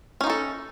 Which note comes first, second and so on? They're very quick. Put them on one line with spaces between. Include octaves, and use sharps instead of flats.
C#4 D#4 F4 A4